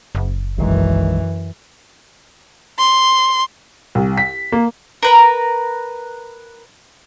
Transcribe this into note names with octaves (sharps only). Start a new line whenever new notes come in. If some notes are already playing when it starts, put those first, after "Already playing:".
F#1
B1 F#2 D#3 E3 G#3
C6
C2
B6
A#3
A#4 B4 A#5